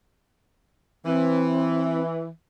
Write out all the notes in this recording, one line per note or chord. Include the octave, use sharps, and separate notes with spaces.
E3 C4